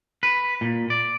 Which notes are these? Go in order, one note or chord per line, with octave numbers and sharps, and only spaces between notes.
B4
A#2
D5